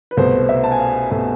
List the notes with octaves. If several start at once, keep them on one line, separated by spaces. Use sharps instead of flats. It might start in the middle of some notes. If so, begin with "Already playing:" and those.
B4
C2 B2 A3 C5
E5
A5
G#5
F5
B2 A3 G#5